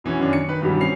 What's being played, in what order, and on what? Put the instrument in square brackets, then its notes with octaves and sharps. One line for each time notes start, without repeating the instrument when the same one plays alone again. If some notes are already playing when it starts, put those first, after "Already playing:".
[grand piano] B2 E3 C#4
F#2 D#3 C#4 D4
C#7
D#3 B4
G2 B2 D#3 E3 F#3 G3
C4 C#4 C7 F7